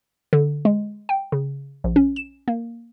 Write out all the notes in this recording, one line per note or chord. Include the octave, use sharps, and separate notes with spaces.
D3
G#3
G5
C#3
A#1
C#4
E7
A#3